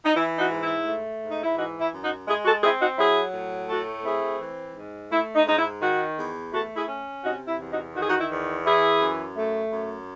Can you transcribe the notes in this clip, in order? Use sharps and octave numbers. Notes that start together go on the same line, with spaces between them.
D#4
E3 E4
D#4 F#4
G#2
E4
A3
G#2
D#4
E4
E3 D#4 F#4
E4
F#2
D#4 F#4
G#3 E4 G#4
F#4 A4
C4 E4 G#4
D#4 F#4
F#3 E4 G#4
A2
A3 F#4 A4
C4 E4 G#4
E3
G#2
A3 E4
D#4
G#2 D#4
E4
D#3 D#4 F#4
E2
A3 F#4 A4
E4 G#4
C#4
C3 D#4 F#4
E4
E2
D#4 F#4
D#3 F#4
G#4
D#4 F#4
E4
E2
E3 E4 G#4
F#2
A3
F#2